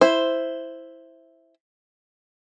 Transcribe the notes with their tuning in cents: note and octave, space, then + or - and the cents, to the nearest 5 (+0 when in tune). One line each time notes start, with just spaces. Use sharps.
E4 +0 C5 +0